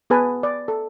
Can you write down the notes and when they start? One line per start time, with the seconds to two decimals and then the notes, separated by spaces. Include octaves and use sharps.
0.10 B3 G#4 B4 G#5 A5
0.43 D5
0.68 A4